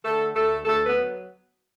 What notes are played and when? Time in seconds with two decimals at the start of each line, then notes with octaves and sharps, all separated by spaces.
0.03 D3 A3 A4
0.34 D2 A3 A4
0.65 D2 A3 A4
0.86 B3 B4
0.96 F#3